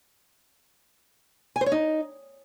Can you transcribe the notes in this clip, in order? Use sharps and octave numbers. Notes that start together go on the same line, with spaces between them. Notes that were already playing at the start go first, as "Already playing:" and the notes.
G#5
C5
C#5
D#4